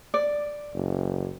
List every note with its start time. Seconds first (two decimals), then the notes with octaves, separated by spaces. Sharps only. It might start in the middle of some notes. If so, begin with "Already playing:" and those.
0.14 D5
0.74 F#1